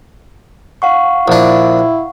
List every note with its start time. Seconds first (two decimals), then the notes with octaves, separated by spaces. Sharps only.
0.82 F5 F#5 C#6
1.28 A#1 D4 E4